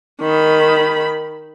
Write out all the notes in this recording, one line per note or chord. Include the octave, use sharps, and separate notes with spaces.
D#3 B5